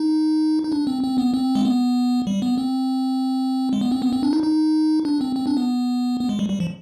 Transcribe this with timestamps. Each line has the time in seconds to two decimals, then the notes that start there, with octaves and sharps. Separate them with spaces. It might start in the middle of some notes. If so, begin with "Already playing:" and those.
Already playing: D#4
0.64 D#4
0.72 D4
0.87 C4
1.03 C4
1.18 B3
1.34 C4
1.55 G#3
1.65 B3
2.27 G3
2.42 B3
2.58 C4
3.73 G#3
3.81 B3
3.92 C4
4.02 B3
4.13 C4
4.23 D4
4.33 D#4
4.43 D#4
5.05 D4
5.21 C4
5.36 C4
5.47 D4
5.57 B3
6.20 B3
6.29 G#3
6.39 G3
6.50 G3
6.60 F3